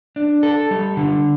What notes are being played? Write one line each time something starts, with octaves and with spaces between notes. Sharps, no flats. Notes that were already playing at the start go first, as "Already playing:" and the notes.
D4
A4
G3
D3